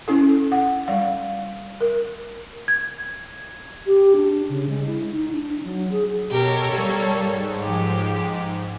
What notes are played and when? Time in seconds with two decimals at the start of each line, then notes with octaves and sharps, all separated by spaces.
0.08 C#4 E4 A4
0.52 F#5
0.88 G3 F5
1.81 A#4
2.68 G#6
3.86 G4
4.16 D4
4.49 C#3
4.69 G#3
4.86 E4
5.12 D#4
5.33 D4
5.63 F#3
5.92 G#4
6.30 B2 G4 A4 A#4 C#5
6.72 G3 A#3
7.16 G#2
7.62 F3 G4